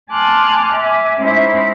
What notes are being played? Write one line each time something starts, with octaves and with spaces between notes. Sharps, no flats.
G#5 A5 C6 D6 F6 F#6
E5 G#5 D6
G#3 C#4 D#4 E4 C5 E5